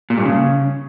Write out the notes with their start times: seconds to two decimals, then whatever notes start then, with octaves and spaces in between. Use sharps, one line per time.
0.10 A#2
0.18 G2
0.26 C#3